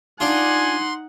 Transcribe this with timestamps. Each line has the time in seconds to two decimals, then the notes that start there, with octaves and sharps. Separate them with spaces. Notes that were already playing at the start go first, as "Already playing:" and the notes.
0.20 D4 D#4 F4 F#5 G#5 C6